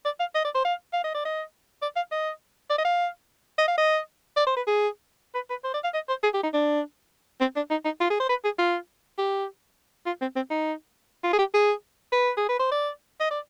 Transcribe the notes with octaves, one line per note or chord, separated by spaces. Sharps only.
D5
F5
D#5
D5
C5
F5
F5
D#5
D5
D#5
D5
F5
D#5
D5
D#5
F5
D#5
F5
D#5
D5
C5
B4
G#4
B4
B4
C5
D5
F5
D#5
C5
G#4
G4
D#4
D4
C4
D4
D#4
D#4
F4
G#4
C5
B4
G#4
F4
G4
F4
C4
C4
D#4
F4
G#4
G4
G#4
B4
G#4
B4
C5
D5
D#5
D5